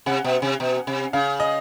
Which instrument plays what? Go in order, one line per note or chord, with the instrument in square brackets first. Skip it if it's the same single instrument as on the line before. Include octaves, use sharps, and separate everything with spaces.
[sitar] C3 [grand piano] F#5
[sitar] B2
C3
B2
C3
[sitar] C#3 [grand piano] F5
[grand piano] D#5